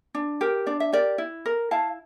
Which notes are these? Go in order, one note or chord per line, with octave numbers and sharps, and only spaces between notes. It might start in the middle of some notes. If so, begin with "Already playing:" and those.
D4
G4 A#4
D4 D5
E5
G4 A#4 D5
E4
A#4
E4 F5 A5